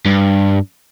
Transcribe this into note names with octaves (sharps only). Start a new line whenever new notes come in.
G2